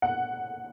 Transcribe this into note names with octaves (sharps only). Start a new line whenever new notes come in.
F#5